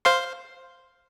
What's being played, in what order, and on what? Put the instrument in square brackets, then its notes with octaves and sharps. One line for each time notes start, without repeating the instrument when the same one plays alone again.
[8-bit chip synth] C5 F5 C6